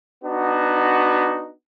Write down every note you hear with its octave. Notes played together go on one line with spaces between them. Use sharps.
B3 D4 D#4 F#4